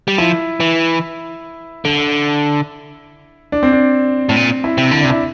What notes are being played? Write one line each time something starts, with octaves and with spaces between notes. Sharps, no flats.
G3
F3 E4
E3
D3
D4
C4
D4
A2
A#2
E4
C3
D3 E4
C3 D4
E4